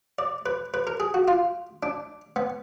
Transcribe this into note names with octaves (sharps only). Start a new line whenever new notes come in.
D5
B4
B4
A#4
G#4
F#4
F4
D4
B3